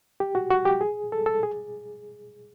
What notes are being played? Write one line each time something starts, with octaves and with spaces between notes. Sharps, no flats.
G4
F#4
F#4
G4
G#4
A4
A4
G#4